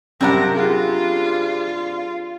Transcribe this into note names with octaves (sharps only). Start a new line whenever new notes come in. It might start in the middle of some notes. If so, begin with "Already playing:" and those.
F#2 C3 G3 C4 D4 A#4 F#5
F4 G4 G#4